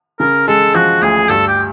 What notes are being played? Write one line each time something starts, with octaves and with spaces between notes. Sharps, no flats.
C#3 A#4
G#3 A4
F3 F#4
D2 G#4
G2 A4
G4